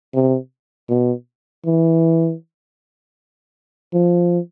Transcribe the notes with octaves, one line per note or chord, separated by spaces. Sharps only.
C3
B2
E3
F3